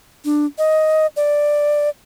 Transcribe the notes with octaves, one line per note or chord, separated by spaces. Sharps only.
D4
D#5
D5